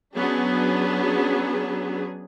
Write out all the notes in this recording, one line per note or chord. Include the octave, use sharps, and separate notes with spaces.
F#3 B3 C#4 D4 G#4